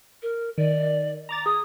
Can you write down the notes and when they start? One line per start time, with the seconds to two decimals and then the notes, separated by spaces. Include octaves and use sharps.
0.22 A#4
0.58 D#3 D5
1.29 A#5 D6 A6
1.46 G#4 D#6